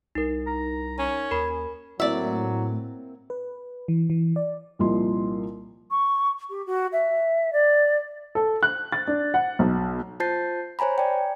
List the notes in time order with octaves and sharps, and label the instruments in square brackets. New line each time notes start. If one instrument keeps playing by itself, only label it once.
[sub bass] C2 [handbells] D#4 A#4
[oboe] A#5
[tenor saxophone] C#4 [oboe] G#5
[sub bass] D#2 [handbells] A#4 B5
[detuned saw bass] A2 [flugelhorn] F#3 [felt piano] A#3 C4 E4 [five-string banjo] D5 E5
[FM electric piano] B4
E3
E3
D5
[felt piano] C2 A#2 F3 D#5 C6
[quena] C#6
G4
F#4
E5
D5
[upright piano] A4
F#6
A6
D4
F#5
B1
[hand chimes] F4 C5 A5 G6 A6 C7
C5 C#5 G#5 A#5 B5
D5 G5